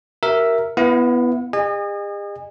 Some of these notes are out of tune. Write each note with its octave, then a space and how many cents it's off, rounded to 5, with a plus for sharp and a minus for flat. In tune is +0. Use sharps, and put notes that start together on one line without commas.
G4 -45 A#4 +0 E5 +0
B3 +0 E4 +15 F#5 -45
G#4 -45 D#5 -35 G#5 -25